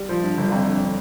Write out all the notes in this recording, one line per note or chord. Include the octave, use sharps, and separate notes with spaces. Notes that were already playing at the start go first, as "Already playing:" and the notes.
Already playing: G3
F3
G2
G1
F2
D3